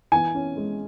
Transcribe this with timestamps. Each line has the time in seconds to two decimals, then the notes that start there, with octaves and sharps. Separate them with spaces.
0.12 E3 G#5
0.35 C#4
0.57 G#3